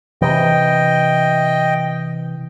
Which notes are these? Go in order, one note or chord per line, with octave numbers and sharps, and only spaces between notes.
C3 E3 D#5 G5